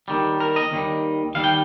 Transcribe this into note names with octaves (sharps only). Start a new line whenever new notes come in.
D#2 D#3 G3
A#4
D#5
D#2 D#3 G3
D#2 D#3 G3 F5
G5